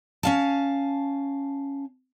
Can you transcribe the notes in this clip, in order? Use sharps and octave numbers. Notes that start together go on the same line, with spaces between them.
C#4 F5 A5